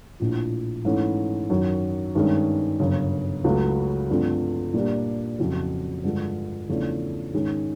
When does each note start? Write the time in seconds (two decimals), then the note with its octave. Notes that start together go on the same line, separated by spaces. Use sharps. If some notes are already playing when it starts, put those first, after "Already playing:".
0.20 A#1 A2 F3
0.85 G#2 E3 A3 C#4 E4
1.50 F#2 D#3 F#3
2.15 G2 D#3 G#3 C#4
2.80 G1 F#2 C#3
3.44 C#2 C#3 F#3 A3
4.09 G2 D3 F3 A3 C4
4.74 A#2 G3 A#3 D4 G4
5.39 F2 C#3 F#3
6.03 G2 D3 F3 G#3
6.69 E2 C#3 F3 A3 D4
7.33 G#2 D#3 G#3 C#4